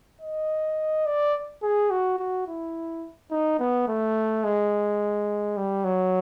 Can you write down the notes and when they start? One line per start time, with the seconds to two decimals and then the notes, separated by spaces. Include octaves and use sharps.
0.21 D#5
1.06 D5
1.62 G#4
1.91 F#4
2.19 F#4
2.47 E4
3.31 D#4
3.59 B3
3.88 A3
4.44 G#3
5.57 G3
5.84 F#3